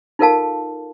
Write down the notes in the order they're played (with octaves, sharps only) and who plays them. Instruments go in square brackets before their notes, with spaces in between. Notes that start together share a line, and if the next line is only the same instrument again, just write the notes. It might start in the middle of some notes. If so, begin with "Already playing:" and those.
[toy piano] D#4 F4 A4 A#4 F5 A5